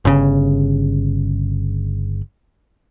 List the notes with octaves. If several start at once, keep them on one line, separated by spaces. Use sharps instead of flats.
G1 C#3